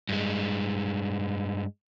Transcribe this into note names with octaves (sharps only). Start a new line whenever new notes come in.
G2 G#3